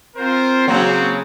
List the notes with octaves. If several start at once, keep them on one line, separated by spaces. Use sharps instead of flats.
C4 F4 A#4 C5
C#3 F#3 A#3 C4 F#4 C#5